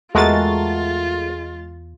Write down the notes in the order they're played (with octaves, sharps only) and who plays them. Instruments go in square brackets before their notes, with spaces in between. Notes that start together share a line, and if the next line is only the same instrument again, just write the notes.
[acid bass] E2 [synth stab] G#3 A6 [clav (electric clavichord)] A3 F#4 A#4 [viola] F4